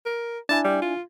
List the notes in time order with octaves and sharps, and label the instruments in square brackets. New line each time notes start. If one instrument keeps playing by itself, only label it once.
[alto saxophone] A#4
[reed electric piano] D4 E4 G#5 [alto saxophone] A5
[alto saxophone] G3
F4